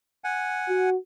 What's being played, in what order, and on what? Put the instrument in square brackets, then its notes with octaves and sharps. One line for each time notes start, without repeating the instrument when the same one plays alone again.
[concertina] F#5 G#5
[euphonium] F#4